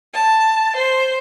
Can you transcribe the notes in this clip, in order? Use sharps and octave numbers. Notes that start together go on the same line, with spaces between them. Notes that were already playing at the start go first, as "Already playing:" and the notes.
A5
C5